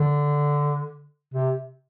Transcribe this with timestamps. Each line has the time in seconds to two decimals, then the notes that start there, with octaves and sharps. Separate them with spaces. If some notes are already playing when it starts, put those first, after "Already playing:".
Already playing: D3
1.34 C3